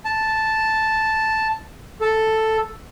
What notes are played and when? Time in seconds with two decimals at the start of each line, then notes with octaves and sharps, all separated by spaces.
0.05 A5
2.01 A4